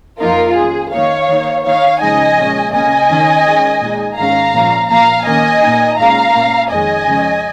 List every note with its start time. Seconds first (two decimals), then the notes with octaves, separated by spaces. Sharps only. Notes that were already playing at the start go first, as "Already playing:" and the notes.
0.20 F2 F3 A#3 D#4 F4 A#4
0.56 D#3 G#3 C#4 G#4
0.92 D#3 A#3 D#4 C#5 F5
1.28 D#3 A#3 D#4
1.64 D#3 A#3 D#4 C#5 F5
2.01 C#3 F3 G#3 D#4 D#5 G#5
2.37 A#2 G#3 C#4
2.73 C#3 A#3 C#4 D#5 G#5
3.09 D#3 C#4
3.46 D#3 G#3 C#4
3.81 A#2 G#3 D#4
4.17 G#2 D#3 G#3 C#4 F5 A#5
4.53 A#2 F3 C#4
4.90 A#2 F3 A#3 F5 A#5
5.26 D#3 A#3 C#4 D#5 G#5
5.62 A#2 A#3 D#4
5.98 A#2 G#3 C#4 F5 A#5
6.34 A#2 A#3 C#4
6.70 F2 D#3 G#3 C#4 D#5 G#5
7.06 C#3 F3 G#3 C#4